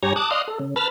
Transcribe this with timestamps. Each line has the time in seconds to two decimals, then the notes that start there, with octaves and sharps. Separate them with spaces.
0.03 G2 G4 C#5 G#5 A#5
0.16 A5 D6 D#6 F#6
0.31 D5 D#5 F5 C6 D#6 F#6
0.48 A4
0.59 C#3
0.76 B4 A5 B5 F6 A6